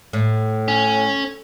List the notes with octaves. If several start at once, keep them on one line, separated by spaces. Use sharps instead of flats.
A2
C#4